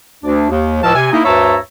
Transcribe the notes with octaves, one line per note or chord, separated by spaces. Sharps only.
D2 D4
D#2
C#2 A2 F3 A5 E6 F6
C3 G#5
A#3 D#4 E4
D2 G2 C#5 E5 A5 A#5